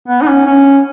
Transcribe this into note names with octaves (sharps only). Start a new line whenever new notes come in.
B3
D#4
C#4
C#4